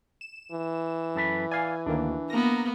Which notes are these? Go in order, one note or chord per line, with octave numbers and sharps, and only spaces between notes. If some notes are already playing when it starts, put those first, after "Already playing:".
E7
E3
F#2 A4 B4
D5 F5 G#5
D2 D#3 A#3 D4
A#3 B3 A#5 A#6